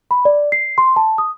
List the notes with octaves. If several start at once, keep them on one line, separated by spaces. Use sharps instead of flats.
B5
D5
C7
C6
A5
D#6